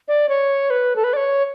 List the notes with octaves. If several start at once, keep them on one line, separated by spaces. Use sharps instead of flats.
D5
C#5
B4
A4
B4
D5
C#5